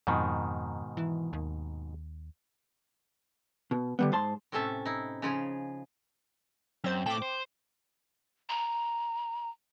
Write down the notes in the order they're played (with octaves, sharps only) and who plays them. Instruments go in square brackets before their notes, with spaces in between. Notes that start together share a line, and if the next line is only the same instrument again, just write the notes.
[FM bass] F2 [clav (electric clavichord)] G#2 B2 D#3
[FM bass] E3
D#2
[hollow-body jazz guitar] B2
D3 G3 B3
G#2 C5 A5 C6
[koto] A2 C3 C#4 A4 E5 A5
D#4 E4
C#3 F3 G#4
[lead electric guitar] F#2 [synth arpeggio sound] C4 C5
[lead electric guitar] A2 A4 [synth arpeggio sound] G5 D6
[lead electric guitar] C5
[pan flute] A#5